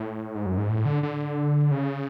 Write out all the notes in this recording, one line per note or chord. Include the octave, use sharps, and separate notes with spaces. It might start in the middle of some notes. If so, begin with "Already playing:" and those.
Already playing: A2
G#2
F#2
G#2
A2
D3
D3
C#3